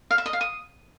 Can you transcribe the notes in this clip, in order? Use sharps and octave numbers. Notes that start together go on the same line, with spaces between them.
F5
E5
D#5
F5
D#6